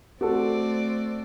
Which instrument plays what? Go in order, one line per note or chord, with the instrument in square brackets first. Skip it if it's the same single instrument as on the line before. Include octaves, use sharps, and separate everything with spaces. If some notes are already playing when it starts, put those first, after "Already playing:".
[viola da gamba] A3 C4 D5 [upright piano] F#4 A4